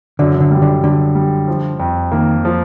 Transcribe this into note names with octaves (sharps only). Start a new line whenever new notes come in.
F#2 D3
D3
G3
D3
D3 G3
G3
F3
F2
D#3 A#3
F3